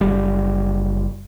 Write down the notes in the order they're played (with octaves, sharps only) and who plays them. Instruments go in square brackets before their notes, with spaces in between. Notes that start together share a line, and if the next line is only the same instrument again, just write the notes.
[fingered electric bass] F#1 G3